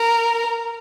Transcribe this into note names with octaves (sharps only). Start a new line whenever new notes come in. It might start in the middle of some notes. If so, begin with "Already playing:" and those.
Already playing: A#4